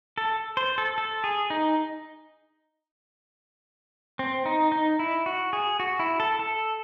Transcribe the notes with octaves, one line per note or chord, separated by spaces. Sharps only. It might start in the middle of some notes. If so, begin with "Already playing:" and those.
A4
C5
A4
A4
G#4
D#4
C4
D#4
D#4
E4
F#4
G#4
F#4
E4
A4
A4